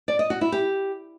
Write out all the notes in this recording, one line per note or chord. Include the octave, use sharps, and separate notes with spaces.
D5
D#5
F#4
E4
G4